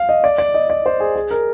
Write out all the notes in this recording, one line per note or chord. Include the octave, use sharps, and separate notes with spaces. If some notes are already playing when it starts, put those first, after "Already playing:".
Already playing: F5
D#5
D5
D5
D#5
D5
C5
G#4
G#4
A#4